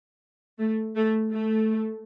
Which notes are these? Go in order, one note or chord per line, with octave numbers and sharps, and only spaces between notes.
A3
A3
A3